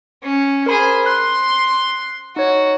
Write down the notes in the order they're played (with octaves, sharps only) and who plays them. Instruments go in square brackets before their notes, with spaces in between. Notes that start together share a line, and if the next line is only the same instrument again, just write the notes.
[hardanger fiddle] C#4
[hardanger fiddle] G#4 C5 [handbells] A#4 B5
[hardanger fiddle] C6 [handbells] F#6
[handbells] D#4 C#5 [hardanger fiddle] F#4